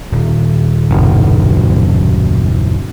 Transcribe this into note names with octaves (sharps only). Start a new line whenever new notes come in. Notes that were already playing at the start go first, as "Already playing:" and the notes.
D#1
F#1 B1